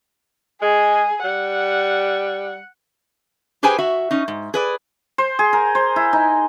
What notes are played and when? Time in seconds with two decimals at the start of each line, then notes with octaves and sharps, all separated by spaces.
0.62 G#3 G#4
1.24 G3 F#5
3.63 G4 G#4 B4 C5 G5 G#5
3.78 F#4 E5
4.11 C#4 D#4
4.28 G#2
4.54 G#4 B4 D5
5.18 C5
5.39 G#4
5.53 A#4
5.75 C5
5.96 E4
6.13 D#4